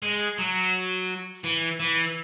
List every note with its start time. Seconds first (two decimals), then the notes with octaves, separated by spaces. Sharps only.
0.02 G#3
0.38 F#3
1.44 E3
1.80 E3